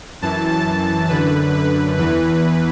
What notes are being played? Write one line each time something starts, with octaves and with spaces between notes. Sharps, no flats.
F#2 E3 A5
A5
F#2 D3 B4
B4
E2 E3 B4